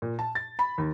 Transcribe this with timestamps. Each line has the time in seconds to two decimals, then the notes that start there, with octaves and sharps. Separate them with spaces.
0.02 A#2
0.19 A5
0.35 A6
0.59 B5
0.78 D#2